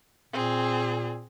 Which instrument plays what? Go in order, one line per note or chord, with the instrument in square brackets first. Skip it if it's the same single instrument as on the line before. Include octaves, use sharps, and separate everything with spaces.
[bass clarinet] A#2 [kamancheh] C4 G#4